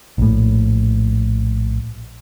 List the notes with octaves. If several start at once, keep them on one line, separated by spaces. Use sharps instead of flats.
A#1 A2